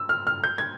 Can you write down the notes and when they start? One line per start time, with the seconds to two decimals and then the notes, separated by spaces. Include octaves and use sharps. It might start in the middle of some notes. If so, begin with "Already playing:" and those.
Already playing: E6
0.09 F6
0.27 F6
0.44 G6
0.58 G#6